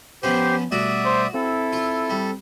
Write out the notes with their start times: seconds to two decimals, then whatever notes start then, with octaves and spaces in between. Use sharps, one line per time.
0.23 F3 B3 C#4 G4 C5
0.72 B2 G3 A3 F#4 D5 E5 D#6
1.05 C5
1.34 C4 E4 A4
1.73 F4
2.10 G3